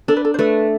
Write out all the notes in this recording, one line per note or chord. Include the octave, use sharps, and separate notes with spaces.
D4 A4
B4
A4
C5
A3 B4